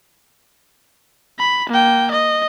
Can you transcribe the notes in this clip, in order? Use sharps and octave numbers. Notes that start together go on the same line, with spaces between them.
B5
A#3 G5
D#5